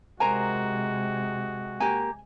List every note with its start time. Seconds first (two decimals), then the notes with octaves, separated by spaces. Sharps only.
0.20 C3 G#3 F#4 A#4 C5 G#5 A#5
1.80 A#3 G4 G#5